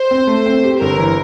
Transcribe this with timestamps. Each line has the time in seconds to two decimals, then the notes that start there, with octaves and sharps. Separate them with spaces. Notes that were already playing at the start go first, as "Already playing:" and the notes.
Already playing: C5
0.11 C4
0.27 A3
0.46 C4
0.64 G4
0.80 G1 A#4
0.99 E3